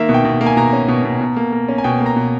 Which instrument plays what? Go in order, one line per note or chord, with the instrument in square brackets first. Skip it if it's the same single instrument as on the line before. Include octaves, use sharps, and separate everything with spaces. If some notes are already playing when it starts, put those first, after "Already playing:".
Already playing: [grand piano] D#3 A#3 E5
B2
G5
B2
A#3
G#5
B2 A#5
C#4
B2
B2
B2
A#3
A#3
C#4
G#5
B2 G5
A#3
A#5
B2